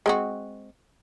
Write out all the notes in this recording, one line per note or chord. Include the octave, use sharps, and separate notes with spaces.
G#3 C4 F#4